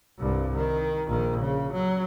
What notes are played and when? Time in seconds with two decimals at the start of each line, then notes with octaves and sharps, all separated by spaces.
0.19 C2 G2
0.56 D#3
1.08 A#1 D#3
1.40 C#3
1.73 F#3